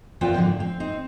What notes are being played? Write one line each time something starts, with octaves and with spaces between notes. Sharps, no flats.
E2 B3 F4 A#4 C5 G5
G#2 B2 D3 D#3 F3
C4
C4 D#4